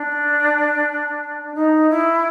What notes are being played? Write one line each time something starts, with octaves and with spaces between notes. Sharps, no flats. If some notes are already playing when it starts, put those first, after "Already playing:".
Already playing: D4
D#4
E4